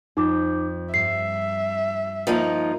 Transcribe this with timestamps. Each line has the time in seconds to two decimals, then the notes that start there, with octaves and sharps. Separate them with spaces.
0.17 F2 D#4 D6 G6
0.94 G2 E5 C7
2.27 F3 A#3 D#4 F4 A#4